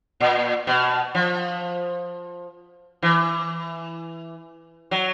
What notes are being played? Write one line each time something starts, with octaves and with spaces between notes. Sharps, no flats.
A#2
B2
F3
E3
F#3